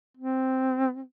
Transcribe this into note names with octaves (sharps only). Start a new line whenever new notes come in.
C4